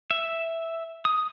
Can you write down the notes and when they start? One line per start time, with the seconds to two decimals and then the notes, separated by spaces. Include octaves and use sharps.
0.11 E5
1.05 D#6